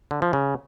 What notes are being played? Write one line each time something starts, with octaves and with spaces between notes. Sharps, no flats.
D3
F3
C#3